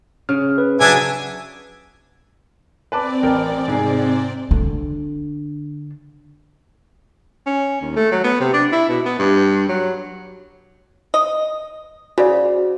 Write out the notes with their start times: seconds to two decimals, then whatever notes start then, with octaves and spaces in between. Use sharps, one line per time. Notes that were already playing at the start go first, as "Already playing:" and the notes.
0.29 C#3 F6
0.58 B4
0.80 C#3 F#3 D4 E5 G#5
2.92 C4 B4 D5 A5 D6
3.23 A1 A#4 G5
3.68 G#2 C3 G#4
4.51 D3 D4
7.46 C#4
7.81 D#2
7.96 A3
8.11 F#3
8.24 B3
8.40 C3
8.53 D4
8.72 E4
8.89 B2
9.06 B3
9.19 G2
9.69 F#3
11.14 D#5
12.18 C#3 F#4 C5 D5